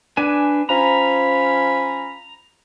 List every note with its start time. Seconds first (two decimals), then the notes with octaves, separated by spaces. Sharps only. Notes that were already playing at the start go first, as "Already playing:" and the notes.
0.17 D4 B4 G#5
0.69 F3 C#4 A#5 B5